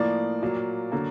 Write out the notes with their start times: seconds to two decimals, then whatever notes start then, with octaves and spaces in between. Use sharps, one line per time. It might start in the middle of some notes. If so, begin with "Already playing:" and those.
Already playing: A2 F3 A#3 D5
0.42 A#2 F#3 A#3
0.92 D3 F#3 A#3